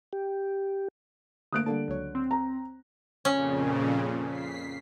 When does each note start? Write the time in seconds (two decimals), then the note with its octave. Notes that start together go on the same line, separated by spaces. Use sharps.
0.13 G4
1.53 D3 A3 A#3 D#6 F#6 D7
1.66 D3 G3 A#3 A5
1.88 C#2 F#3 C#5
2.15 C4
2.31 A#5
3.25 F2 A#2 C#3 C#4
4.25 B6 C7